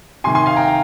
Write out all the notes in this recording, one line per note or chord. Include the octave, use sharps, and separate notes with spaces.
C3 D#3 G#5 C6
G#5 C6
F5 G#5
G5 A#5
F5